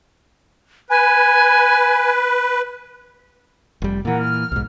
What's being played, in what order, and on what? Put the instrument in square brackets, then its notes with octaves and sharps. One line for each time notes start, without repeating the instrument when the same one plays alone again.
[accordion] B4 [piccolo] G#5
[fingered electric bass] F1 G3
[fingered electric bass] A#2 E3 [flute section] A#4 F#5
[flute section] F6
[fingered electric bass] B1 G#2